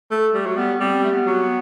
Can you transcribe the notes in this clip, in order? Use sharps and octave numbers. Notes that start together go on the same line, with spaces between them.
A3
G3 A3
F#3
G3 B3
G3 C4
A3
B3
F#3
B3